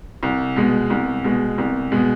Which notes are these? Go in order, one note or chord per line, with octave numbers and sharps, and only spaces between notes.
C2
B2 G#3
C2
B2 G#3
C2
B2 G#3